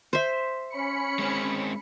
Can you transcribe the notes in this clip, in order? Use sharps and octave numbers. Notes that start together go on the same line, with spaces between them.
C5 E5
C#4 B5 C#7
G#3 C4